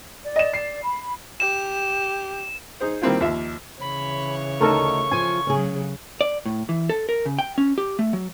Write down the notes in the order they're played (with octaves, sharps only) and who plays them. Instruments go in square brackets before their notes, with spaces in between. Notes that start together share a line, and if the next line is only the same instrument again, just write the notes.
[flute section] D5
[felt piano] D#5 E7
C7
[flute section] B5
[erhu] G4 [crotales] E7
[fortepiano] D#4 G#4 C5
D#3 G3 A#3 C4 E4 F4
D#2 F3 E5
[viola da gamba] C#3 E3 C#5 [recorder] B5
[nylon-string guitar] D2 D#4 [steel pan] A4 A#4 [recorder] C#6
[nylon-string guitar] F3 F4 [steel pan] G#5
[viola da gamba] C#3 F#3 [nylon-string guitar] C#4 G#4
[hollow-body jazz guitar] D5
A2
E3
A4
A#4
C#3
G5
C#4
G4
A3
F#3